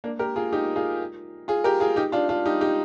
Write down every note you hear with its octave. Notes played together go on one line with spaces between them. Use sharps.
A#3 D4
G4 A#4
F4 G#4
D#4 G4
F4 G#4
F4 G#4
G4 A#4
F4 G#4
D#4 G4
D4 F4
D4 F4
D#4 G4
D#4 G4